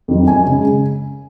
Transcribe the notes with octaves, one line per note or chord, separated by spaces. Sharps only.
F2 D#3 F#3
F#2 G#5
C#3 G#3